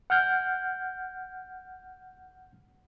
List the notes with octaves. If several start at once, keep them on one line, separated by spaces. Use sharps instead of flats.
F#5 F6 G6